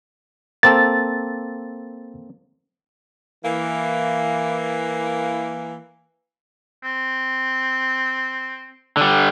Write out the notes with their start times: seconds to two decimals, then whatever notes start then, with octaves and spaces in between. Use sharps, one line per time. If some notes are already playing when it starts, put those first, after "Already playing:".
0.63 A#3 C4 A4 A6
3.44 E3 A#3
6.83 C4
8.97 D3 G3